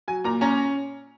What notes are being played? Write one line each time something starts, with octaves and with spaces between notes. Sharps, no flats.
F#3 G#5
A#2 A#5
C#4 A#5